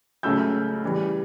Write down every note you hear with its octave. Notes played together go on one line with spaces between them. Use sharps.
C#2 C#3 F#3 A3 C#4 E6 G6
C#3 E3 G3